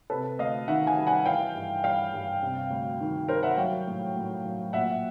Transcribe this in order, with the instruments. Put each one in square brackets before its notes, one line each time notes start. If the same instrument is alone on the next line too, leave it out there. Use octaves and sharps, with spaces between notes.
[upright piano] C3 A4 B4
D2 D#5 F5
D#3 E5 F#5
F#5 G#5
G3
F#5 G#5
E3 F5 G5
G2
G3 F5 G5
G2
C3
D2
D#3
G3 A#4 C5
E5 F#5
F#3 F5 G5
A2
A2
F#3
A#2 E5 F#5